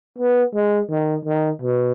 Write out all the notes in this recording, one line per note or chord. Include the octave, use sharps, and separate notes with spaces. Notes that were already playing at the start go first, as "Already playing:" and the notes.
B3
G#3
D#3
D#3
B2